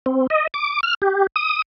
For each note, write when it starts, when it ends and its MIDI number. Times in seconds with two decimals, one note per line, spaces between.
0.06 0.27 60
0.30 0.47 75
0.54 0.81 86
0.83 0.95 89
1.02 1.27 67
1.36 1.62 87